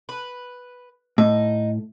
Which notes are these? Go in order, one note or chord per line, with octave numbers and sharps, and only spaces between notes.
B4
A2 D#4